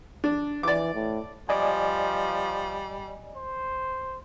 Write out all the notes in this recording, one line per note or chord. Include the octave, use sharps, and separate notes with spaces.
D4
E3 D5 D6
A2
F3 G3 D5 D#5 G#5
C5